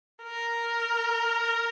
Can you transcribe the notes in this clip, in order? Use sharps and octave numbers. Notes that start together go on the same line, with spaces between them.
A#4